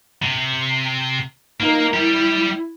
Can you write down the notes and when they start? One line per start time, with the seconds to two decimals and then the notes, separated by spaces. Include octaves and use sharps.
0.22 C3
1.60 A#3 D#4 A#4
1.94 G3 E4 G4